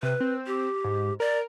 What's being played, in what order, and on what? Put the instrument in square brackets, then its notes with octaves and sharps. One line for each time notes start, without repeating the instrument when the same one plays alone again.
[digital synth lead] C3 [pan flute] B4
[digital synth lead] C4
[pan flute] G4
[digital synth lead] G#2
[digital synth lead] A#4 [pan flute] D5